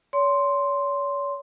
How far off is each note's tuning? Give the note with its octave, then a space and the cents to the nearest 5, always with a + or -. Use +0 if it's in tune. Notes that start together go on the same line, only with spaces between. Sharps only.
C#5 +40 C6 +0